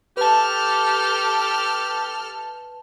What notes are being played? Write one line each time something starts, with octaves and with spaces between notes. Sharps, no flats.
G4 A4 B4 A5 F6